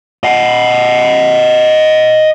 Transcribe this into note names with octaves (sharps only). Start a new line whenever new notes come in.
D#5 F#5